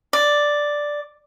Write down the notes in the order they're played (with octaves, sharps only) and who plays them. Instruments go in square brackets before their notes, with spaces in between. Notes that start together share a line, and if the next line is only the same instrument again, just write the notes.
[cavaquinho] D5